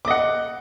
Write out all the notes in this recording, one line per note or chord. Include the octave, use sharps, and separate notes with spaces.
D#5 F#5 D6